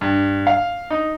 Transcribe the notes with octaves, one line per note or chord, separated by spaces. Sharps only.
G2
F5
D#4